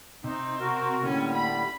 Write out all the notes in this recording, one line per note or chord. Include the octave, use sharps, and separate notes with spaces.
C3 C4 D#4
F#4 A#4
A2 D3 G3 A#3 C#4
B5